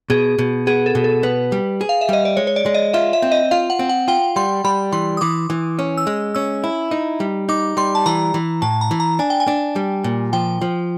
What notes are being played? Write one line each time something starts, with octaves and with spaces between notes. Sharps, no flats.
B2 G#4
B2
B3 G#4
A4
B2
A4
B3 B4
G3
G#4
F5
E5
G3 D#5
D5
G#3 C#5
C#5
D5
G#3
D#5
F4 E5
E5
C4
D#5
F4 F5
F#5
C4
F#5
F4 G5
G3 C6
G3 B5
E3 C6
D#6
E3 D6
E3
C#4
E6
G#3
C#4 E6
E4
D#4
G3
D#4 D6
G3 C6
A5
E3 A#5
E3
A2 A5
A#5
E3
A#5
D4 G#5
G5
G#5
D4
G3
A#2
F3 G5
F3